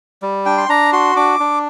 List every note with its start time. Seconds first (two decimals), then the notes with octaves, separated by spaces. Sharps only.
0.22 G3
0.46 D4 G5
0.58 C6
0.69 D4 A#5
0.93 F#4 C6
1.16 D4 D6
1.40 D4